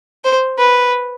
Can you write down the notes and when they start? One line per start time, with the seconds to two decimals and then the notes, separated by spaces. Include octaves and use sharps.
0.24 C5
0.58 B4